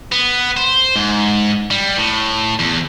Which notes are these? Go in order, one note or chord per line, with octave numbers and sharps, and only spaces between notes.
B3
C5
G#2
G3
A2
E2